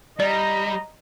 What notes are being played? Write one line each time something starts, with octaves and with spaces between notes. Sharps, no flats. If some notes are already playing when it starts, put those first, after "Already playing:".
G3 D5 D#5 A#5